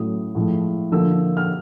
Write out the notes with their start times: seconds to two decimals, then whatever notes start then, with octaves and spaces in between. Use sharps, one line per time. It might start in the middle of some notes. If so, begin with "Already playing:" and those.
Already playing: A2 F#3 A3 C#4 D#6
0.35 A2 F3 G#3
0.92 D3 F3 A#3 E6
1.37 F6